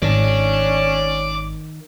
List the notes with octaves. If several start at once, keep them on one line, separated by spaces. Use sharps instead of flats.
G#1 D#3 C#4 D5 A5